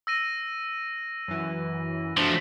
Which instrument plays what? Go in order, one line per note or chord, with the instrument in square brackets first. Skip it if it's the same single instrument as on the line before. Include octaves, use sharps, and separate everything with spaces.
[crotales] E6 A#6 D#7
[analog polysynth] F#2 E3
[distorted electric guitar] F3 A3 [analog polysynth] D4 F#4